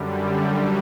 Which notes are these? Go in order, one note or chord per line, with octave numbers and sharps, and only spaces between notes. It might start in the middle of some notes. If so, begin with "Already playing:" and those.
Already playing: F#2 D3 G3